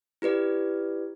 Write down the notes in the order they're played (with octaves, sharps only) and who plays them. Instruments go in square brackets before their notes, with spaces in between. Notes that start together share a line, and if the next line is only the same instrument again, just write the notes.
[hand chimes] E4 G4 B4 D5